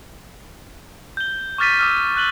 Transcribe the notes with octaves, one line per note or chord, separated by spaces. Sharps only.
G6 G7
C#6 D6 F6 A6 B6 D#7
D6 E6 F6
F#6 D#7 F#7 G7